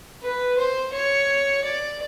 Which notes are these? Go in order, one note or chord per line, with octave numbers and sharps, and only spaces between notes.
B4
C5
C#5
D5